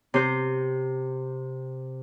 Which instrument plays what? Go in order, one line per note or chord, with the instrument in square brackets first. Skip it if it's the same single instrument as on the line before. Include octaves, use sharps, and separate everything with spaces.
[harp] C3 C5 G6